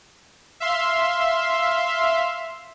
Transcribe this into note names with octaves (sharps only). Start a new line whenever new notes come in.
E5 F5 C6